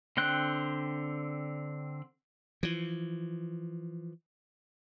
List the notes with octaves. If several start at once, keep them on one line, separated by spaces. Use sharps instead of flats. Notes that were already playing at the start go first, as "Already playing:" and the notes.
D3 C4 G5 F#6
E3 F3